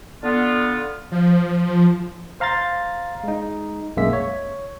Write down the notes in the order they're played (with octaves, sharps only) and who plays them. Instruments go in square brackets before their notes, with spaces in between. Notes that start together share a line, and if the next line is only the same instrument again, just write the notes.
[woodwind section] D3 B3 F4
[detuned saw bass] F3
[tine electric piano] C5 F5 A#5 C6 A6
G#3 D#4
B1 F#2 G#3 A#3 E5 B6
C#5